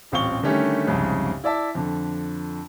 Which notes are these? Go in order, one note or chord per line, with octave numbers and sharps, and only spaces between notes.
D#1 A1 C4 F5 C#6 G7
D3 D#3 G3 A3 C#4 G4
C2 F2 G#2 C#3
E4 D5 E5 A5
F2 D3